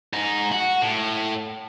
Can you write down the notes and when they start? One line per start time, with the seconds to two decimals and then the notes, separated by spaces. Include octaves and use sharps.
0.13 G#2 D#4
0.52 F#4
0.82 A2